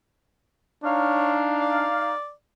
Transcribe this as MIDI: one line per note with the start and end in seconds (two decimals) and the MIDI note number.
0.84 1.87 62
0.84 2.12 63
0.84 1.36 73
0.84 2.12 77
1.62 2.31 74